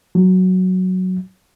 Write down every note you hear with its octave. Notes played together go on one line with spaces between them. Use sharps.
F#3